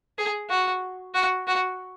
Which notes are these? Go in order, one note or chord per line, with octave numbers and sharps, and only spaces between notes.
G#4
F#4
F#4
F#4